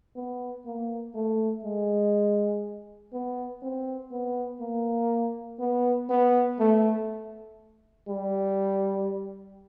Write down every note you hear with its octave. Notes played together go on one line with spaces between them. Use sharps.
B3
A#3
A3
G#3
B3
C4
B3
A#3
B3
B3
A3
G3